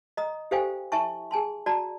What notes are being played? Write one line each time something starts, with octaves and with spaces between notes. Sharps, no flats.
D#5 A#5 D#6
G4 A4 C5 F5 G5 G#5
E4 E5 G#5 A5 C#6
G#4 G#5 A5 C6
F#4 D5 A5 A#5